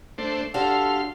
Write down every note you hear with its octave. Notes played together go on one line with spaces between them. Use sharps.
A3 D4 C5
D4 F#4 G4 A4 F5 C6